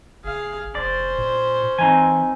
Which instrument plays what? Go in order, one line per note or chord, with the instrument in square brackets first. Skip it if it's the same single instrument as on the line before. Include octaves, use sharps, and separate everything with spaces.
[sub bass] F#1 [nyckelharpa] G#4 F5
[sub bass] F1 [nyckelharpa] C#4 C5 [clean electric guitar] D5
[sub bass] A#2
[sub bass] E3 [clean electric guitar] C4 D#4 G#5